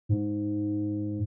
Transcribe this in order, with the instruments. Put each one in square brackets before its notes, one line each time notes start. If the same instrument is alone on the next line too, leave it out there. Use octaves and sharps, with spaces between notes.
[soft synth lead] G#2